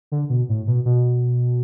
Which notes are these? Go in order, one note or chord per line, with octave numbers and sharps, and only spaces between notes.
D3
B2
A2
B2
B2